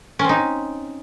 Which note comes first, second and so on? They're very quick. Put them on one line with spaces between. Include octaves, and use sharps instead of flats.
C#4 C4 D#4